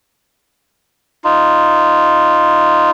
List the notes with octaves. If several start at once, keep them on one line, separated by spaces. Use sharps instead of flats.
D#4 F4